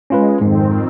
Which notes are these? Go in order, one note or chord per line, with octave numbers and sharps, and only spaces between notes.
G#3 C#4 F4 B4
F2 G#2 D#3 C4